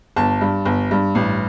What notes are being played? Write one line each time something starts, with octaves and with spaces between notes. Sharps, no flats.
G1 A5
G2
G1
G2
A1